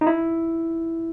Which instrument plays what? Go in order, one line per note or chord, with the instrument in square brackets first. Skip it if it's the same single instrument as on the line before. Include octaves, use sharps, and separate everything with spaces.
[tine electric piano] D#4
E4